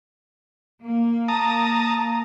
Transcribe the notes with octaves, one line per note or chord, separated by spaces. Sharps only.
A#3
A5 A#5 D#6